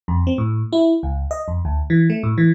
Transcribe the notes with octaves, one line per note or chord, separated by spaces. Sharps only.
F2
C4
A2
E4
C#2
D#5
F2
D2
E3
A3
A2
E3